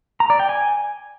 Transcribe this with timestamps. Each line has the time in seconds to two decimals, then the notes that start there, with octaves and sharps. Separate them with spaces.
0.20 A#5
0.30 D5
0.40 G5
0.49 G#5